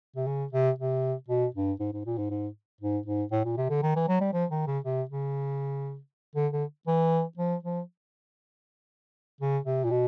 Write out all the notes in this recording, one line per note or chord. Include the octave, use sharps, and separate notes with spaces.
C3
C#3
C3
C3
B2
G2
G#2
G#2
A#2
G#2
G#2
G#2
G#2
A2
A#2
C3
D3
D#3
E3
F#3
G3
F3
D#3
C#3
C3
C#3
D3
D3
E3
F3
F3
C#3
C3
A#2
B2